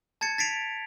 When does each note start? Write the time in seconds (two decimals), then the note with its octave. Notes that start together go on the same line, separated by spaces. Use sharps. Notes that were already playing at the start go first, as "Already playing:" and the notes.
0.21 A5 G#6 A6 C#7
0.38 A6 B6 C7 D7 F7